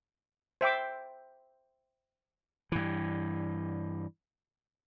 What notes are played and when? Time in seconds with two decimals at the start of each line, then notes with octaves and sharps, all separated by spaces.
0.61 C5 E5 G5 D6
2.72 G2 E3